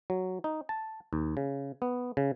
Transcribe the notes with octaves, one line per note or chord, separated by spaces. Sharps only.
F#3
D#4
A5
D#2
C#3
B3
C#3